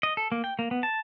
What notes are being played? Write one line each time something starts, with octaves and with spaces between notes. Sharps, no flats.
D#5
A4
A#3
G5
A#3
B3
A5